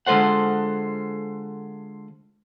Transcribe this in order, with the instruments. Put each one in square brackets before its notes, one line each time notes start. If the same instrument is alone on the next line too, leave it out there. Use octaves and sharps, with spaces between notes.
[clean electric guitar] D3 G#3 F4 A4 C5 F#5